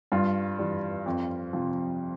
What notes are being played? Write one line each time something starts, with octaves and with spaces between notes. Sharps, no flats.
G2 F4
E3 G3
F2
C3 F3